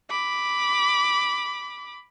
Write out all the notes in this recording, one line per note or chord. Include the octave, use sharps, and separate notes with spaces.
B5 D6